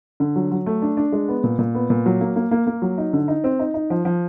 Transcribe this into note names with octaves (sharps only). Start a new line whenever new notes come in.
D3
F#3
F#3
A3
D4
D4
G#3
B3
A#2
A#2
B3
A#2
F#3
A#3
A#3
A#3
A#3
F#3
D#4
D3
D#4
C4
D#4
D#4
F3
F3